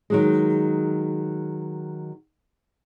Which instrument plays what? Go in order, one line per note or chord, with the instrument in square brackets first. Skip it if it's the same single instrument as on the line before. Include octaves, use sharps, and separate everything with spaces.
[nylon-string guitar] D#3 F#3 G#3